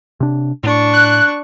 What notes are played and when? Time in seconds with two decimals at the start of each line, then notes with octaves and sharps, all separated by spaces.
0.20 C3 D4
0.63 A2 D4 C#6
0.93 F#6